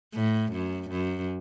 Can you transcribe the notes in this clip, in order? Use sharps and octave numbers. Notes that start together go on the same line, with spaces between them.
A2
F#2
F#2